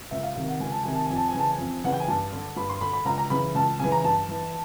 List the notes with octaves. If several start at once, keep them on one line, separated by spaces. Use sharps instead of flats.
C#2 E5
F5
C3 D#3 F5
F#5
C#2 G#5
A5
C3 D#3 G#5
A5
F2 G#5
A5
G#5
C#3 E3 A5
G#5
F2
C#3 E3 F#5
G5
G#5
G2 A5
D3
G2 B5
C6
D3 B5
B5
C#2 A#5
A#5
C#3 E3 B5
C#2 A5
C#3 E3 G#5
A#5
G2 A5
E3